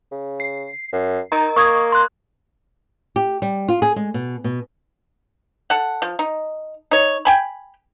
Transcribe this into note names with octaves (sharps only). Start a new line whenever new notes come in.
C#3
C7
F#2
D#4 A#4 D#5 A#5
A#3 C#6 D#6 G#6
C6 F#6
G4
G3
F4
G#4
G#3
B2
B2
A4 F#5
F3
D#4
D#4 C#5
G5 G#5 B5